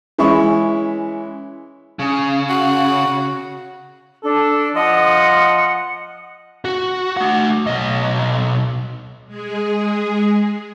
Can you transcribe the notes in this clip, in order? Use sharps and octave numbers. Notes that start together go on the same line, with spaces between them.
E3 G#3 C#4 E5 B5 C#6
C#3
F#4
D4 A4
F3 D#5 F#5
F#4
A3 F#5
B1 D#5
G#3 G#4